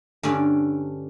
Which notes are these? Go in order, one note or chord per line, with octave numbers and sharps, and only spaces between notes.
G2 D3 C#4 D5